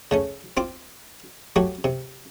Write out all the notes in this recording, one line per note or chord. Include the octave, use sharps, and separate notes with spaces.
C#3 A3 C#4
C4 F4 D6
F#3 A3 F#4 G4
C3